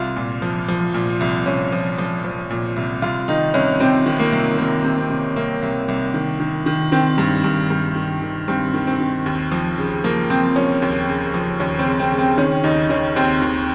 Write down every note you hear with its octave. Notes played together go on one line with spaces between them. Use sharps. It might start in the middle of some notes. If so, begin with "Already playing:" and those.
Already playing: C2 F4
A#2
F3
F3
A#2
C2
C2 C#4
F3
F3
F3
A#2
C2
C2 F4
D#3 D#4
C2 C#4
C3 C4
D#3
A#3
C2
C2 A#3
C3
C4
C3
C2 A#3
C2
C2
D#3
D#3
D#3
D#3 C4
G2
G2
G2
D#3
D#3
G2 C4
D#3
C4
D#3
D#2
F3
C#3
F3 A#3
F3 C4
F3 C#4
D#2
C#3
F3
D#2 C#4
C4
C#3
C4
C#3
C4
D#3 C#4
D#2 D#4
D#3 C#4
D#2 C4
D#2